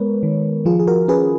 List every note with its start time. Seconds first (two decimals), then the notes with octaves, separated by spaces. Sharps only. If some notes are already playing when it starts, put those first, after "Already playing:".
Already playing: G#3 B3 A#4 B4 C#5
0.23 D#3
0.65 F3 F4 G#4
0.80 G#4
0.88 F#4 A#4
1.08 C#4 G#4 B4